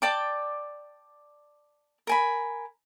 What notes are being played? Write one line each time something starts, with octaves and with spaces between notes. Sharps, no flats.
D5 G5 A5 D6
A#4 G#5 B5